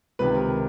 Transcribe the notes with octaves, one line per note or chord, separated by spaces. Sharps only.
C#2 C3 D#3 B4
A#4